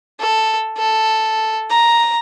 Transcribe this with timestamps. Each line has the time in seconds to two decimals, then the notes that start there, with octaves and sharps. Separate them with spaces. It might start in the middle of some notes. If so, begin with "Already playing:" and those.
0.20 A4
0.77 A4
1.70 A#5